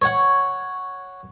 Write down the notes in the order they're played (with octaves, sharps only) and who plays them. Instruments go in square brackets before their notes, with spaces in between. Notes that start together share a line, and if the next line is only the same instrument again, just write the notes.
[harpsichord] C#5 F#5